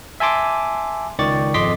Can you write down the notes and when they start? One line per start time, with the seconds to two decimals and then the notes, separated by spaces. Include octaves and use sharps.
0.20 E5 G#5 A5 C6 D6
1.19 C#2 D#3 D5 C#6 A6
1.54 G#1 F2 D#5 C6 D6 B6